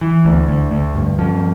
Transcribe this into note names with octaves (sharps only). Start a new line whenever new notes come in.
E3
D2
D2
D2
G2
F3